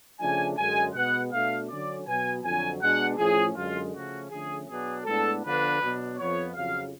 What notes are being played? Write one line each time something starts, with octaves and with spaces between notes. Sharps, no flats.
C#3 F3 A3 D4 G#5
F#2 D3 G#3 G#5
B2 G#3 B3 F#5
B2 A3 D4 F5
D3 F#3 C#4 D5
B2 F#3 B3 G#5
F2 D3 F#3 G#5
B2 G#3 D4 F#5
A2 F3 A3 C#4 G#4
F#2 D3 G#3 F4
C#3 F3 A3 C#4 F#4
D3 F3 A3 C#4 G#4
B2 F#3 B3 D4 G#4
A2 G#3 B3 D4 A4
D3 F3 B3 D4 B4
B2 F#3 B3 D4
F2 F3 B3 C#5
F2 C#3 F#3 F5